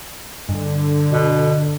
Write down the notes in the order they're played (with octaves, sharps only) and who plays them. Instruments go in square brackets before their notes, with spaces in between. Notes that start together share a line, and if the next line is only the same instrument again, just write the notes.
[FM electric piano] G2 [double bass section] D3
[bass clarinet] B2